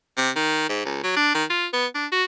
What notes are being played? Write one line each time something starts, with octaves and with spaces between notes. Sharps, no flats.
C3
D#3
G#2
C#2
F#3
D4
D#3
F4
B3
D4
F#4